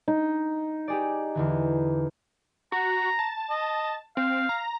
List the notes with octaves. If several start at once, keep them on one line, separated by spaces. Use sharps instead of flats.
D#4
G4 G#4 D5
E2 D3 E3
F#4 A#5
A5
D#5
C4 F5
A#5